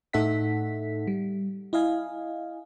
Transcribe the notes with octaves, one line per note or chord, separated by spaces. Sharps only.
A2 D#4 A4 E5 F#5 B6
G3
E4 D#5 F5 G#5